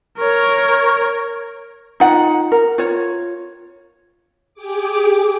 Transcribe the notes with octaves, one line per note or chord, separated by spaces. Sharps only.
A#4 C#5
D#4 F4 F#5
A#4
F4 C#5
G4 G#4 D6